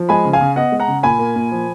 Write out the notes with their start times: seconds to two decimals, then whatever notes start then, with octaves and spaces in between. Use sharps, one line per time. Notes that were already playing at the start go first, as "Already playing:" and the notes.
Already playing: F3
0.09 G#3 G#5 B5
0.25 C#3
0.33 F5 G#5
0.41 C#3
0.56 B3 D#5 F#5
0.72 G#3
0.80 F#5 A#5
0.88 C#3
1.03 A#2 G#5 B5
1.19 A#3
1.36 A#2
1.52 F3